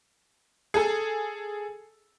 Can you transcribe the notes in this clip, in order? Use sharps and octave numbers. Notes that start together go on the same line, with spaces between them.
G#4 A4